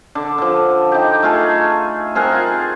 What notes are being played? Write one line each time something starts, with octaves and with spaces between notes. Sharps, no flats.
D3
D3 F3
D#4 G4
A3 F4 G#4
C4 G#4 A#4 F#5
F4